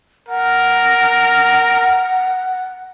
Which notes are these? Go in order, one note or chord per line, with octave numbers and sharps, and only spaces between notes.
A#4 F#5